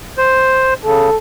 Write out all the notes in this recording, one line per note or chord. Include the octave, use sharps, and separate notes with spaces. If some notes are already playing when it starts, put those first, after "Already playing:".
C5
C#3 A4